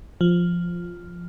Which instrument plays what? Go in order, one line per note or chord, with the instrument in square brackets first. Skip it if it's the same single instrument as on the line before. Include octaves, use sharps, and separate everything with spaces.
[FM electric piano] F3